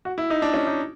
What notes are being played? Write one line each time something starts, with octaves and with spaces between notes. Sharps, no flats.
F#4
E4
D#4
D4
C#4
D#4